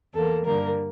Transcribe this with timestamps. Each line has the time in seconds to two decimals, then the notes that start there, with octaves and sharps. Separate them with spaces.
0.13 E2 E3 A#3 A4
0.44 G2 D3 G3 A#3 A#4